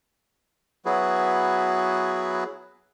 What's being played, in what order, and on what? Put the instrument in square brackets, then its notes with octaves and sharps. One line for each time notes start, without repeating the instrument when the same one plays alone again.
[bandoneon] F#3 B3 E4 F#4 G#4 B4